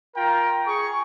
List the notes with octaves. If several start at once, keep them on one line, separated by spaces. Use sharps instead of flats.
F4 A#4 G5 A#5
G#4 C#6